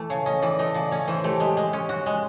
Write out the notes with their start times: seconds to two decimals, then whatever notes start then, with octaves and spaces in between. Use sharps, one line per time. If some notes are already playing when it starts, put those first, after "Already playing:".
Already playing: E3 A3
0.10 C#3 C#5
0.26 C#4 D#5
0.42 E3 D5
0.59 A3 D#5
0.74 C#3 D5
0.91 C#4 C#5
1.08 E3 C5
1.24 A3 G4
1.40 G#3 G4
1.57 G#3
1.73 C#4
1.89 F#4
2.06 G#3